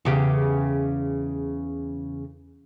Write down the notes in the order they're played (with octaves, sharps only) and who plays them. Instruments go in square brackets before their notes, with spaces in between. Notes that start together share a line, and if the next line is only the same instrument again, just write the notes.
[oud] E2 C#3 G4